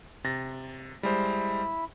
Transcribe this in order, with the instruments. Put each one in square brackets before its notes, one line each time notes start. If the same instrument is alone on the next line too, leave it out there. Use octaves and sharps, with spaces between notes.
[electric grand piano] C3 A6 A#6
[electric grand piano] G3 G#3 C5 [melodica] E4